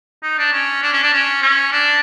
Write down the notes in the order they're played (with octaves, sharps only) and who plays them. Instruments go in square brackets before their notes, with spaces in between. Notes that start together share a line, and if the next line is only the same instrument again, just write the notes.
[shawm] D#4
D4
C#4
D4
C#4
D4
C#4
C#4
D4